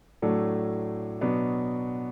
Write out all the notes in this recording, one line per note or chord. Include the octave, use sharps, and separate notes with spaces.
A2 F#3 A3 D4 A4
B2 F#3 B3 D4